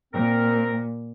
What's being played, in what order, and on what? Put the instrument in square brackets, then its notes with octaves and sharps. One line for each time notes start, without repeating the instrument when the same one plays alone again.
[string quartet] A#2 [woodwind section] C4 A#4